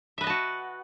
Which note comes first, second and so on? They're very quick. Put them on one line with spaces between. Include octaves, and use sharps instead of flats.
E5 B4 D#5 A5 F#4